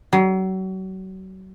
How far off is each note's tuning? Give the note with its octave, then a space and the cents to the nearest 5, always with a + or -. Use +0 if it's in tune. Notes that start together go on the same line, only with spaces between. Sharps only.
F#3 +35